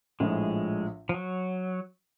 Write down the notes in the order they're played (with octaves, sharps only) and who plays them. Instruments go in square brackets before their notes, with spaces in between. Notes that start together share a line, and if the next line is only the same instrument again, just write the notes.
[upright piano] A#1 A2 F3 [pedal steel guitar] G#3
[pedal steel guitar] F3
F#3